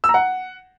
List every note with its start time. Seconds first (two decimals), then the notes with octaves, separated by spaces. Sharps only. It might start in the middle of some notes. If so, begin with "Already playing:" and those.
0.04 E6
0.09 A#5
0.14 F#5